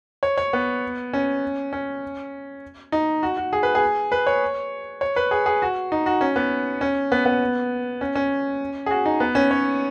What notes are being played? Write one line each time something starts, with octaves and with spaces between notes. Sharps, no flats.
C#5
C#5
B3
C#4
C#4
D#4
F#4
F#4
G#4
B4
G#4
B4
C#5
C#5
B4
G#4
G#4
F#4
D#4
F#4
C#4
B3
C#4
B3
B3
C#4
C#4
G#4
F#4
D#4
B3
C#4
C#5